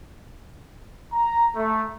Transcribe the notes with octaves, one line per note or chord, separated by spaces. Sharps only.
A#5
A3